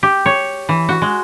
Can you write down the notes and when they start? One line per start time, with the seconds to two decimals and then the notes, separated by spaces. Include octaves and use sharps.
0.03 G4
0.26 C#5
0.69 E3
0.89 F#4
1.02 G#3